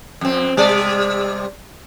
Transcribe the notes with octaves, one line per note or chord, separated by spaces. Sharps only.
F2 C4
C3 G3 D5